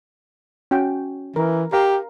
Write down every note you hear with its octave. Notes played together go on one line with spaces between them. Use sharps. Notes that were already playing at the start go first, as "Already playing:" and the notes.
C#4 F#4 G5
E3 A#4
G4 A#4 F5 A#5